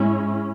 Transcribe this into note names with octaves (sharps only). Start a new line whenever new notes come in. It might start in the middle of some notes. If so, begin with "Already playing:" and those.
Already playing: G#2 G#3 C#4 E4